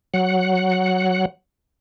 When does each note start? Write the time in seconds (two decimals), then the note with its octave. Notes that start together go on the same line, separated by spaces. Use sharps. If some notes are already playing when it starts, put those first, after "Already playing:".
0.14 F#3 F#5